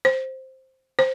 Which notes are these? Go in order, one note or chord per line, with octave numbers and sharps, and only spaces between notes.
C5
C5